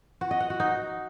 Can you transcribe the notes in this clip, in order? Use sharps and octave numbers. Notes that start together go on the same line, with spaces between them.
F#4
D#5
F#5
F#4
D#4